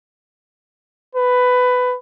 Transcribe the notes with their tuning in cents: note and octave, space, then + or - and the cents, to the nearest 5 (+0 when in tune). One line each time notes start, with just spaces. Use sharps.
B4 +15